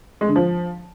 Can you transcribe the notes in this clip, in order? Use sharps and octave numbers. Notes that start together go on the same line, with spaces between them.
G#3
D3
F3